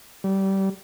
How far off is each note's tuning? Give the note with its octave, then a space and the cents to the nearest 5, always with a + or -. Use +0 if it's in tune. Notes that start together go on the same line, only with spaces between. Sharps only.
G3 -20